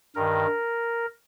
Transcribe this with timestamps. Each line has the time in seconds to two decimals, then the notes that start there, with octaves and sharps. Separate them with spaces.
0.16 G2 D#3 A#4